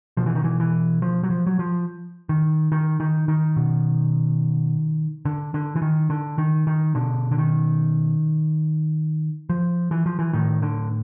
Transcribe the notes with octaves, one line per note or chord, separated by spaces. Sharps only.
B2 F3
E3
D#3
E3
E3
F3
F#3
F3
F#3
F3
D#3
D#3
D#3
D#3
B2
D3
D3
E3
D#3
D3
D#3
D#3
B2 D3
D3
D#3
F3
E3
F3
E3
A2 D#3
D3